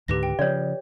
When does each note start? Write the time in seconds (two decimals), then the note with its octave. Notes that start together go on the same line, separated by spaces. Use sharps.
0.08 C#2 G#2 D3 G4 B4 A#6
0.23 G5
0.39 C#3 F3 C#5 D5